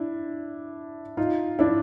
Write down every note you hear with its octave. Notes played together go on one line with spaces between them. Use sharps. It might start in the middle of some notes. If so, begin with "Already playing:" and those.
Already playing: D4 E4
D#4 F4
D4 E4